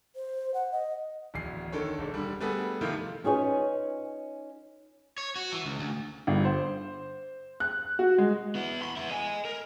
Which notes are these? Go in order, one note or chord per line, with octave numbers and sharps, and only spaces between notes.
C5
F#5
D#5
D1 E2 C7
D3 D#3 A4 C#5
E1 D4
D3 G3
G3 A3 B3 G#4 A4
C3 D#3 F3 A3 E4 F4
C#4 D#4 F4 G#4 B4 C#5
C#5
F#4
E3
C#2
D2
G1
C5
F#6
F#4
G#3
B3 E4
B5 C6
B3 E4
D#5 G#5
A#4